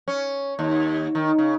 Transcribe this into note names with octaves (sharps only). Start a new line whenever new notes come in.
C#4
D#2
D#3
C#3